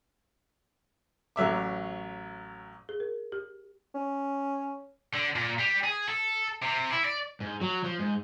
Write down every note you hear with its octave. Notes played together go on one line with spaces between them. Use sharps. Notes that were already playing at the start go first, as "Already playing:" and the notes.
A1 F#3 E5 D6
G#4
A#4
G4
C#4
D3
A#2
G3
G#4
A4
C3
E4
D5
G#2
F#3
F3
G#2